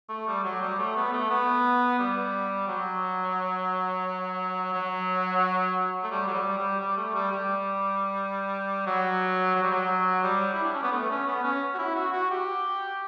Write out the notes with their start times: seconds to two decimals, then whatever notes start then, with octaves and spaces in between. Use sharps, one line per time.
0.09 A3
0.27 G3
0.44 F#3
0.62 G3
0.79 A3
0.96 B3
1.13 A3
1.30 B3
1.99 G3
2.68 F#3
4.74 F#3
6.03 A3
6.11 G3
6.27 F#3
6.34 G3
6.58 G3
6.80 G3
6.97 A3
7.15 G3
7.32 G3
8.86 F#3
9.55 F#3
9.63 G3
9.71 F#3
10.23 G3
10.53 E4
10.63 D4
10.73 C#4
10.83 B3
10.92 A3
11.10 C#4
11.27 B3
11.44 C#4
11.75 F#4
11.78 E4
11.95 F#4
12.13 F#4
12.31 G4